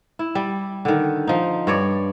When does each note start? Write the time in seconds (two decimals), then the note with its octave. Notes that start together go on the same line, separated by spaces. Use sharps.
0.19 E4
0.35 G3
0.85 D3 D#3
1.27 F3 D#4
1.67 G2 C#5 D5